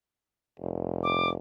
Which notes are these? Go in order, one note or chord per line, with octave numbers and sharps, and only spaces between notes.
F1
D6